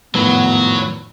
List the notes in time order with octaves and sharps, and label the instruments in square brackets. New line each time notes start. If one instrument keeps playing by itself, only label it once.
[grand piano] G#1 F2 A2 [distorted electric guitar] F#3 [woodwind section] B3